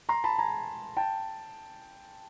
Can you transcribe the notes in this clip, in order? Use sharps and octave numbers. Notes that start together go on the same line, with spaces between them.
A#5 C6
A5 B5
G#5 A#5
G5 A5